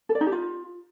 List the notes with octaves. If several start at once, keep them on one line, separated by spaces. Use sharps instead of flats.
A4
D5
D#4
G4
F4